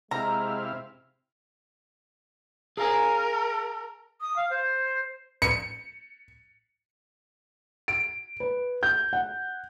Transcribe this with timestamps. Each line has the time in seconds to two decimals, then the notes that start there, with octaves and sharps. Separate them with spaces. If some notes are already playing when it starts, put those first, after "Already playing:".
0.11 C3 G#3 E4 F5 A#5
2.77 G#4 A#4 F5 G#5
4.20 D#6
4.36 F5
4.50 C5
5.42 C#7
7.88 D7
8.40 B4
8.83 G6
9.13 F#5